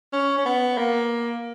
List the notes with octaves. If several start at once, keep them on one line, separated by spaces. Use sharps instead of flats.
C#4
C#4
B3
A#3